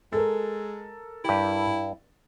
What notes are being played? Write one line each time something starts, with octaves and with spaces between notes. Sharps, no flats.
G#3 A4 A#4
G2 E4 G4